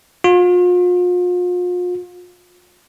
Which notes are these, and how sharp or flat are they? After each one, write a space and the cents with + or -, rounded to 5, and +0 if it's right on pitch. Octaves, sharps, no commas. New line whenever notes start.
F4 +40